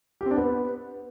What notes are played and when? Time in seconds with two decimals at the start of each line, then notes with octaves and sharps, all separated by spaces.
0.21 G4
0.26 C4
0.31 D4
0.36 B3